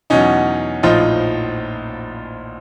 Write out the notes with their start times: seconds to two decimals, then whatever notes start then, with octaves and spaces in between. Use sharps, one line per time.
0.10 E2 B2 F#3 C#4 D#4
0.83 A#1 A2 F3 D#4 F4